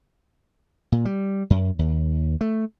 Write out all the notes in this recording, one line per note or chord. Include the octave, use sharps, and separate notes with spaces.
A#2
G3
F#2
D#2
A3